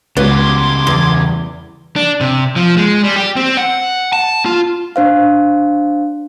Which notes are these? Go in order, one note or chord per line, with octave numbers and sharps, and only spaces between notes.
C#2 C#3 G3 B3 F#4 C6 D6 G#6
E2
D4
C3
F3
G#3
G3
G4
C4
F#5
A5
F4
D4 C5 F5